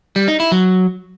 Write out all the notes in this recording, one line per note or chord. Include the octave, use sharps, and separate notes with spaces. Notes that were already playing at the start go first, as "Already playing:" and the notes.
G3
D#4
E4
F#3